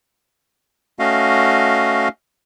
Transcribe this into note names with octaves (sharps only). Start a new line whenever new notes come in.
A3 C#4 F#4 D#5 F5